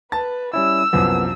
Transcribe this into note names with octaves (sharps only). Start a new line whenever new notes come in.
B4 A5 A6
G3 C#4 E4 E6
C2 F#2 F3 B3